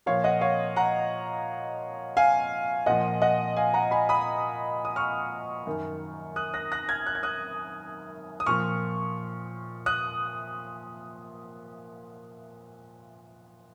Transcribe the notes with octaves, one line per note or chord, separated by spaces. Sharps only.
A#2 F3 C#5 F5
D#5 F#5
C#5 F5
F#5 A#5
F5 G#5
A#2 F3 D#5 F#5
D#5 F#5
F5 G#5
F#5 A#5
G#5 B5
B5 D#6
D#6
C#6 F6
F#2 D#3
D#6 F#6
F#6 A#6
F#6 A#6
F6 G#6
F#6
G#6
D#6 F#6
D#6
A#2 F3 C#6 F6
D#6 F#6